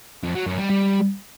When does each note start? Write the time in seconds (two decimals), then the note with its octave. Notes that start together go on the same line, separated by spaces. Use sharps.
0.23 F2
0.35 F#3
0.47 F#2
0.58 G3
0.70 G3